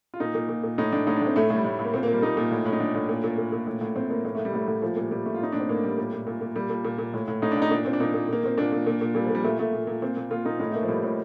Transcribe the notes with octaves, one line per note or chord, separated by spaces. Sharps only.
F4
A#2 D#4
A#2
A#2
A#2
A2 D#4
A2 D4
A2 D#4
D4
A2 C4
A2 A3
A2 G3
A2
A2
A#3
A#2 C4
A#3
A#2
G3
A#2 D#4
A#2
A2
A2
D#4
A2 D4
A2
A#2
A#2
A#2
A#2
A2
A2
A2 C4
A2 A#3
A2 A#3
A2 A3
G3
A2 A3
A2
A#2 F3
A#2 G3
A#2 G3
A#2 A3
F4
A2 D#4
A2 D4
C4
A2 A#3
A2 G3
A#2
A#2
A#2
A#2
A#2 G3
A#2
A#2
A#2
A2
A2
A2 D#4
D4
A2
D#4
A#2 D4
A#2 C4
D4
A#2 D#4
A#2
A#2 A#3
A#2 C4
A#2 D4
A#2
A#2
A#2
A#2 G3
F3
A#2 G3
A#2 A3
A#2 A3
A#2
A#2
A#2 C4
A#2
A#2 F4
A#2 D#4
A2 D#4
A3
A2 A#3
F3
A2 G3
A2 F3